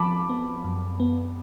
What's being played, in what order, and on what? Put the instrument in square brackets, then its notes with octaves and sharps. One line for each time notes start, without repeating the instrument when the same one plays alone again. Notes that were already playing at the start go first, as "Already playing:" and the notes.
Already playing: [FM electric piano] F3 [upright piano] A5 B5 D6
[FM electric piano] B3
F#2
B3